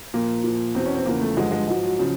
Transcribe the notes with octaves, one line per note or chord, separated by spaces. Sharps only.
A#2 F3 A#3
A#2 F3
E2 B2 C4
C#4
C4
E2 C#3 F3 A#3
A3
G2 D3 F3 G#3
G#3
G#2 F3 F#3
F#3
C#3 F3